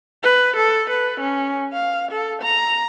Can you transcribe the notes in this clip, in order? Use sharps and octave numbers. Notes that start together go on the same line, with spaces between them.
B4
A4
B4
C#4
F5
A4
A#5